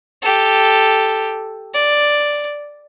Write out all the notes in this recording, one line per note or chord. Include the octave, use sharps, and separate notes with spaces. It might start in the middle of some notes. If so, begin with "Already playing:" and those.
G4 A4
D5